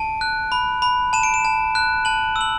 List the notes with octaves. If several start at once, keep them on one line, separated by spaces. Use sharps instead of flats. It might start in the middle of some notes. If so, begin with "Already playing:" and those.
Already playing: A5 D7
F#6
B5
B5
A5 E7
D7
E7
A5
F#6
A5 F#7
E6
F#7